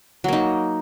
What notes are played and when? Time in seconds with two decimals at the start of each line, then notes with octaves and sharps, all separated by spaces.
0.24 F#3
0.28 A#3
0.33 D#4